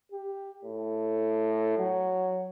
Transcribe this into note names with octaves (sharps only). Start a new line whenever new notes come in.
G4
A2
F#3